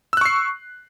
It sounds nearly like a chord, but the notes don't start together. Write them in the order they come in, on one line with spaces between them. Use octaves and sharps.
E6 F#6 C#6 C7